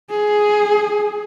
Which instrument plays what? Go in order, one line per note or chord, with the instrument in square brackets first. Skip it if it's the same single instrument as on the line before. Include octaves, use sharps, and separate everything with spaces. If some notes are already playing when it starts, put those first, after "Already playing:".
[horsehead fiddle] G#4